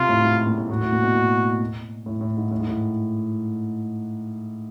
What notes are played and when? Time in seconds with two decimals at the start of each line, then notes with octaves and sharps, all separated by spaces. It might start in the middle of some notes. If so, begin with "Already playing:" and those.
Already playing: C3 F4
0.09 A2
0.23 G#2
0.47 A#2
0.58 A2
0.70 A2 F#4
0.81 A2
0.92 A#2
1.03 B2
1.15 A#2
2.06 A2
2.21 A2
2.37 G#2
2.51 A2
2.60 G#2
2.67 A2